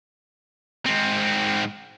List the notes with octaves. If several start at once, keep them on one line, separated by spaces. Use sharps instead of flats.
G#2 C4